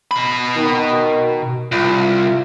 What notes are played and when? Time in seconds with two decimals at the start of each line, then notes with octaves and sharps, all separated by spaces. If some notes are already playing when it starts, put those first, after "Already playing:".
0.11 B2 B5
0.57 D#3
1.72 C2 F4